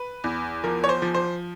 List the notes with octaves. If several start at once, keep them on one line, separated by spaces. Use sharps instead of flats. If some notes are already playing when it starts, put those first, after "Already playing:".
Already playing: B4
E2
F3 A#4
C#5
C5
F3
C5